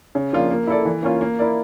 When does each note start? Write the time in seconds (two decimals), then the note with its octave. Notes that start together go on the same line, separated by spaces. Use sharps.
0.15 C#3
0.33 F3 A#3 D4 F4
0.50 A#3
0.67 E4 A4 D5
0.85 E3
1.03 A#3 C#4 F4
1.21 A#3
1.39 E4 A#4 D5